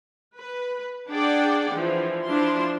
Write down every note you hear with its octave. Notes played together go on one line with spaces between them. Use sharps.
B4
D4 G#4 D5 F#5 G5
E3 F3
F3 D4 E4 F4 C6